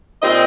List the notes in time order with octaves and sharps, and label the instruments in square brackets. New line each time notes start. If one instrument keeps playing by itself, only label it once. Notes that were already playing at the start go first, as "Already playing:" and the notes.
[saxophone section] A#2 G3 C4 D#5